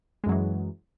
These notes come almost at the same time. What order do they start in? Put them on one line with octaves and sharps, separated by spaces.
G#3 F#2 F#3 E3